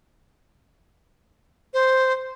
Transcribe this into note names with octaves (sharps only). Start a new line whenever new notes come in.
C5